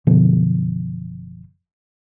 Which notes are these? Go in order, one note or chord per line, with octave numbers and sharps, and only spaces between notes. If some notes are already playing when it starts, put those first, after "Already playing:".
F#1 B2 D3 F3